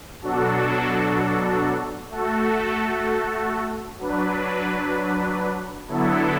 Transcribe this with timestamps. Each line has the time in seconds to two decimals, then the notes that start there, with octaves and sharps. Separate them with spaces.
0.22 B2 F#3 D4 F#4 A4
2.10 A3 F#4 A4
3.99 F#3 D4 B4
5.88 D3 F#3 B3 E4 A4